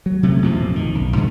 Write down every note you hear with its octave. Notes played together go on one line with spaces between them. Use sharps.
F#3
C3 F#3 A3
A1 F2 B2 F3
D#3
B1
G2 D3 F3 G#3